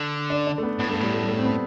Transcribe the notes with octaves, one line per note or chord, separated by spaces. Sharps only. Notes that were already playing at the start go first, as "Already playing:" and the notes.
Already playing: D3
D4
D4
A3
B3
A2 B3
G2 A3
A2 G3
A3
G3
A3
C4
B3